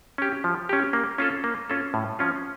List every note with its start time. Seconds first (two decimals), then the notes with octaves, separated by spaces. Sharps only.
0.18 C#4 G4
0.44 F3
0.69 C#4 G4
0.93 A#3
1.18 C#4 F4 A4
1.44 A#3
1.70 C#4 F4 A4
1.94 A2
2.19 F3 C#4 F4